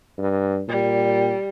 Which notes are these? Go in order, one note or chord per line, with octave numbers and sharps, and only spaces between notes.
G2
A#2 G3